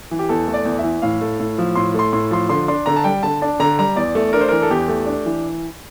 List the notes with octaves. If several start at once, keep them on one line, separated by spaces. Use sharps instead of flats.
E3
G4
E2 A4
A3
D5
E2
E5
E3
A2 F5
A3
A2
F3
A2 C6
A3 C6
A2 C6
F3 C6
D3 C6
D4 C6
D3 A#5
A5
G3 G5
D3 A5
D4 A5
D3 A#5
G3 A#5
E2 D5
A3
D4 A#4
C5
E3 A#4
A4
E2 G4
A3
D4
E3